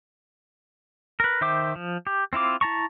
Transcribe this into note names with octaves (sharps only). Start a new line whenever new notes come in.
A#4 B4
D#3 C5 E5 G5 D6
F3
G4
C4 E4 F4 D6
E4 A5 A#5 C#6